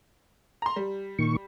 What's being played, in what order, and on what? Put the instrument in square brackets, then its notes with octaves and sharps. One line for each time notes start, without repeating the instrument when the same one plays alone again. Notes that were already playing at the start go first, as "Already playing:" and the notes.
[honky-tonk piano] A#5 C6
G3
[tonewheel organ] A#2 D#3 C#6